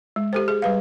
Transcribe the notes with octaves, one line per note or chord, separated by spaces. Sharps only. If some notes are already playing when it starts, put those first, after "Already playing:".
G#3
G4 A4 C5
G#4
G3 B4 F5